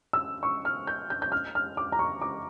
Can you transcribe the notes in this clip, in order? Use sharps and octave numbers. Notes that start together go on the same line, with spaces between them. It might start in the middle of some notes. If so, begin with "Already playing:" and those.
E6
C#6
F6
G6
G6
G6
F6
F6
D6
A#5
C#6
D6